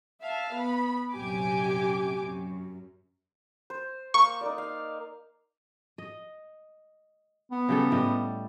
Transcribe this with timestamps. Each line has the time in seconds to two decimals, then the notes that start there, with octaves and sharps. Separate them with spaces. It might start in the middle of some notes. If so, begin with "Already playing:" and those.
0.21 E5 F5 A5
0.54 B3 B5
1.13 A#1 F#2 C3 G4 G#5 D6
2.21 F#2
3.70 C5
4.14 A#3 C#6
4.41 D#4 A#4 D5
4.58 F5
5.98 D#5
7.52 B3
7.69 C#3 G3 A4
7.91 A2 G3 D#5